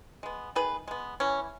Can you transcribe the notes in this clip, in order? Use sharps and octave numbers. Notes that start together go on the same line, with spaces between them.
G#3 B3
D#3 G#4 B4
G#3 B3
E3 C#4